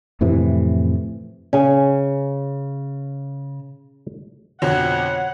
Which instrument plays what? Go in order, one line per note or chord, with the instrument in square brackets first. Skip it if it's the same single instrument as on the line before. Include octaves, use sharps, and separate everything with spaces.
[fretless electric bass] F2 A2 C3 E3
[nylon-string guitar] C#3 [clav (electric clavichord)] C#4 G#4 G#5
[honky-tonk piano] F2 B2 D3 [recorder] C#5 [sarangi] F#5